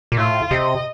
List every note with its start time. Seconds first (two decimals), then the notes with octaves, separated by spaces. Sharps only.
0.12 A#2
0.17 A2 F4
0.51 C3 D#5